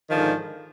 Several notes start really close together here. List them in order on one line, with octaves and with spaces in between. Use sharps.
D#3 F3 D3 G#2